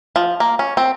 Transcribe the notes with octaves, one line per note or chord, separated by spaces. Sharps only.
F3
A#3
C#4
C4